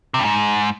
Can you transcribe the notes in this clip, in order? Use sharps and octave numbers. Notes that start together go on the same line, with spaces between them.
C3
G2
G#2